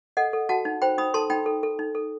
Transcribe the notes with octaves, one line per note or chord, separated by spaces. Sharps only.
A4 D#5 F#5
A4
F#4 F#5 A5
D#4
C5 G5 B5
D#4 B5 D#6
A4 A5 C6
D#4 G5 B5
A4
A4
D#4
A4